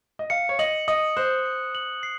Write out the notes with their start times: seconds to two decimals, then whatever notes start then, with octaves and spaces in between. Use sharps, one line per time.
0.19 D#5
0.30 F5 C#7
0.49 C#5
0.59 D#5 F#7
0.88 D#5 D#6
1.17 C5 F#6
1.45 C#7
1.75 F#7
2.03 C7